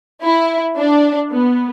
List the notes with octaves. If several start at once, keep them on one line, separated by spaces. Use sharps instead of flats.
E4
D4
B3